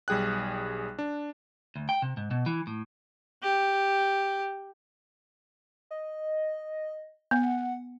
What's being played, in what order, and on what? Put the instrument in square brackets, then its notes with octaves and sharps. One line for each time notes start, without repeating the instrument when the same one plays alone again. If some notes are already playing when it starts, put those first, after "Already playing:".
[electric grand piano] B1 G3 G#4 G5 F#6
D4
[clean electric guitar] D2
G5
C3
G#2
B2
E3
A2
[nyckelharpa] G4
[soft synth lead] D#5
[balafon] B3 [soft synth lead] F#5